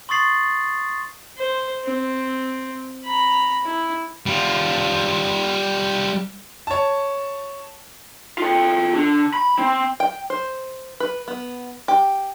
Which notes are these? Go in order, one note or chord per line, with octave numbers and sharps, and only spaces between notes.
C6 C#6 D#6 A6 C7 F#7
C5
C4
A#5 B5
E4
G3 F4
C#5 A5
F4 A4
D3
B5
C4
G5
C5
B4
B3
G4